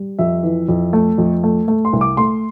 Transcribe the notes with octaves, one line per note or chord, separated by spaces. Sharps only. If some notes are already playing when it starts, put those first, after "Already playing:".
Already playing: G3
F2 E5
E3
F2
A3
F2
A3
A3
C6
C2
D6
A3 C6